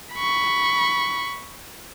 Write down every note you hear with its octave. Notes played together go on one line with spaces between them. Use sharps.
B5 C#6